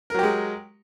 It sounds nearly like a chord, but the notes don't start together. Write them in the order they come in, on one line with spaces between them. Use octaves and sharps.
A#4 F#3 G4 G#3